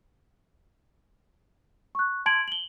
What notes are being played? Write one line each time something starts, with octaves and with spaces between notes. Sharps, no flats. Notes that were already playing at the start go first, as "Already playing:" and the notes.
C#6 F#6
A5 C6 G#6 D7 F#7
F#7 G7